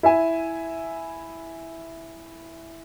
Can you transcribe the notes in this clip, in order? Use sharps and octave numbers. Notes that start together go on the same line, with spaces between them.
E4 E5 G#5